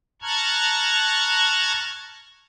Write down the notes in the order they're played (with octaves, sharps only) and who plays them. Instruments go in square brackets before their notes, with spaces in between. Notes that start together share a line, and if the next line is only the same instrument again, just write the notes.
[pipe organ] A5 A#5 C#6 F6 F#6 G#6